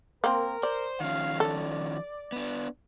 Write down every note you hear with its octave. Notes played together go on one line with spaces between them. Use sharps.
A#3 C4 A#4
C5 D5
D#3 F3 C#4 F5
A4 D5
B3 D4